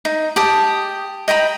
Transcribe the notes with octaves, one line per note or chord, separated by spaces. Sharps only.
D#4
G4 A5 D#6
D#5 G5 A#5 B5